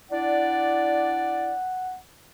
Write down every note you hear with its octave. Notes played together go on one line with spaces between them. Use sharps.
D4 E4 D5 F#5